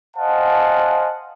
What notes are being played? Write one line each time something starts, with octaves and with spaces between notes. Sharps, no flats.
C5 D#5 F5 F#5 G#5 A5